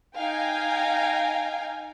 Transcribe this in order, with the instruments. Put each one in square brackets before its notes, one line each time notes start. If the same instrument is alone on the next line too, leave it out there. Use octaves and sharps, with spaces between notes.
[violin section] D#4 F5 G5 G#5